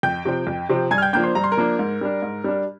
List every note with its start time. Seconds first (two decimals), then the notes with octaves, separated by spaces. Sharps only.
0.03 F2 G5 G6
0.25 C3 F3 C4
0.47 F2
0.69 C3 F3 C4
0.91 G2 G#5 G#6
0.98 F6
1.02 G5 G6
1.13 F3 A#3 D4 G5 G6
1.24 C5 C6
1.35 G2 A#5
1.44 C6
1.52 A#4 A#5
1.57 F3 A#3 D4
1.79 G#2
2.01 G3 D4
2.22 G#2
2.44 G3 D4